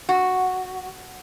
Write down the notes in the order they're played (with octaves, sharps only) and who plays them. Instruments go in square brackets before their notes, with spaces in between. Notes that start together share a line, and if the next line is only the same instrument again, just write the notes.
[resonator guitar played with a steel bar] F#4